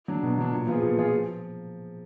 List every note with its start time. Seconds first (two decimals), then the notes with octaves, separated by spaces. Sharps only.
0.08 F#3 D4
0.23 B2
0.38 F#3 D4
0.52 A#2
0.67 F3 B3 F4 G#4
0.82 A#2
0.97 F3 B3 F4 G#4
1.11 F3